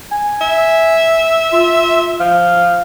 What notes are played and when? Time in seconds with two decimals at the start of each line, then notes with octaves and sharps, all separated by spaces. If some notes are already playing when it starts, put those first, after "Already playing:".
0.12 G#5
0.41 E5
1.53 F4
2.20 F3 F5